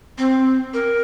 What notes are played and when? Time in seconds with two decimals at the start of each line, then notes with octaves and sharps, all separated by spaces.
0.18 C4
0.74 A#4